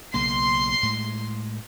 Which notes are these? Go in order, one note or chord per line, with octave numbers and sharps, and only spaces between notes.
B1 C#3 A#3 C6
A2 G#3